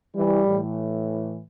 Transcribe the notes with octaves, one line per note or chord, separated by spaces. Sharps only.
E3 G3
A2 E3